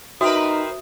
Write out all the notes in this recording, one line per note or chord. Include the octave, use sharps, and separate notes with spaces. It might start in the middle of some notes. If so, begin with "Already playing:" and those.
C4 D#4 F#4 A#4 B4 E5 D#6